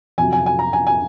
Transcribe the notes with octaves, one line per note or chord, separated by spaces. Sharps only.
F2 C3 F#3 G#5
G#5
G#5
A#5
G#5
G#5